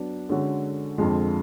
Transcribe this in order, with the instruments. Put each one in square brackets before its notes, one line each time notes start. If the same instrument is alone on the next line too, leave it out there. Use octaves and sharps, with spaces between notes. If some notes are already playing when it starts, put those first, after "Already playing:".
Already playing: [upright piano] F#3 B3 D4
D3 G#3 C#4 F#4 A4
F2 D3 F3 G#3